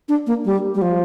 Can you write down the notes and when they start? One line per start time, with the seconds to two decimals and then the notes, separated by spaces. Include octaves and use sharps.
0.09 D4
0.27 A#3
0.45 G3
0.75 G3
0.82 F3